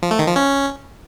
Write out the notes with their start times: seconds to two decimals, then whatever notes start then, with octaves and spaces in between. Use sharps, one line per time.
0.03 F3
0.11 A3
0.19 D#3
0.28 F3
0.36 C#4